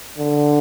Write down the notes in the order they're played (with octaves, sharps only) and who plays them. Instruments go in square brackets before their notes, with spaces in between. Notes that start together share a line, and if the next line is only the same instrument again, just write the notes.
[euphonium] D3